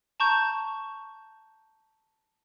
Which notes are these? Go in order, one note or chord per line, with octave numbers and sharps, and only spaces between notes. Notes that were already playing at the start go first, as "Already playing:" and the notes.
A5 A#5 C#6 G6